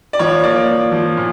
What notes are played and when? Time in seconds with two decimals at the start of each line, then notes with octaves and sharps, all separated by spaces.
0.13 D5
0.19 F3 C#5
0.43 A#3 D5
0.68 F3
0.92 F3
1.17 A#2